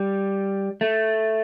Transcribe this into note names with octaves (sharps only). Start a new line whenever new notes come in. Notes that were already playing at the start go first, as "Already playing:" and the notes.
Already playing: G3
A3